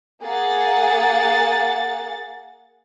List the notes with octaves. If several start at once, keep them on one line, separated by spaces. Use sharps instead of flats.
A#3 G#4 F#5 A6